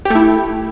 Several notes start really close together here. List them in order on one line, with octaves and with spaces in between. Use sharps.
G4 A3 E4